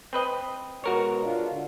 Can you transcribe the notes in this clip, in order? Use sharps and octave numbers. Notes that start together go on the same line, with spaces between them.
C4 B4 D#5
B2 G#3 F#4 A#4 C#5
D4 F4
D3